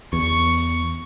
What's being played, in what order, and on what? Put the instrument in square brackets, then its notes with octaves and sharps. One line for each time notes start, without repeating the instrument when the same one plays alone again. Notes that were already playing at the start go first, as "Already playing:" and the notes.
[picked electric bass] E2 [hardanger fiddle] C#6